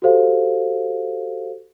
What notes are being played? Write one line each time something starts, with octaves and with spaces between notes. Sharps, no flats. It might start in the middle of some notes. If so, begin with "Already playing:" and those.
F#4 G4 A4 C5 F5